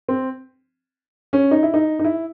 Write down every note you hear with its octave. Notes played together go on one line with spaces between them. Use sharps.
C4
C#4
D#4
E4
D#4
D#4
E4